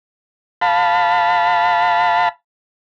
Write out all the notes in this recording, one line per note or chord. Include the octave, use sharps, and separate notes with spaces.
F5 A5 B5